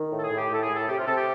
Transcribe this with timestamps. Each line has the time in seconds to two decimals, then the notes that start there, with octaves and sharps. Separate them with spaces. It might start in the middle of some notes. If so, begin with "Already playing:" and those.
Already playing: D#3
0.11 A2
0.19 A4
0.24 G#4
0.30 A2
0.37 G4
0.50 A2 A4
0.62 G#4
0.69 A2
0.76 A4
0.88 C3 G4
0.98 F4
1.06 C3 A4
1.17 G4